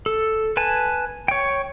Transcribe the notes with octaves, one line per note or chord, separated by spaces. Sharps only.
A4
B4 G#5 A5
C#5 G5